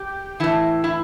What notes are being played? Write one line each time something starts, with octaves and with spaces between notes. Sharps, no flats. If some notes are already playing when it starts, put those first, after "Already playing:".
Already playing: G4
A2 E3 E4
E4